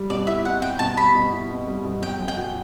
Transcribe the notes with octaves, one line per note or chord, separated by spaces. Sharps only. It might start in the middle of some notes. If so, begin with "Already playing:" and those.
Already playing: G3
B2 D5
E4 E5
C4 F#5
G3 G5
B2 A5
G3 B5
B2
E4
C4
G3
B2
F#3 G5
F#2
G5
F#4